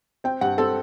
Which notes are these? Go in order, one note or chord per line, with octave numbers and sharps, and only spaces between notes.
C4 G5
G2 F#5
C4 A4